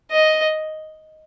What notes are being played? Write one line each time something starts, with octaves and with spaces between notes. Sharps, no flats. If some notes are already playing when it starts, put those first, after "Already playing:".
D#5